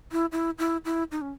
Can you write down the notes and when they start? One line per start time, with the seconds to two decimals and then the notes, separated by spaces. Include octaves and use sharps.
0.12 E4
0.32 E4
0.58 E4
0.85 E4
1.12 D#4
1.21 C#4